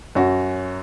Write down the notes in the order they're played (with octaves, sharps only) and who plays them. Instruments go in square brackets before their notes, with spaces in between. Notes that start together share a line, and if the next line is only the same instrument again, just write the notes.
[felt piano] F#2 F#4 [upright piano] C#4